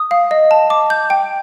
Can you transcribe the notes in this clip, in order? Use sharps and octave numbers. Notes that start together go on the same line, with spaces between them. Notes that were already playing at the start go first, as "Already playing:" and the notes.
Already playing: D#6
F5
D#5
A5
D6
G6
G5